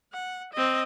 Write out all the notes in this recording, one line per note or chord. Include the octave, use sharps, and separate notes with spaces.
F#5
C4 D#5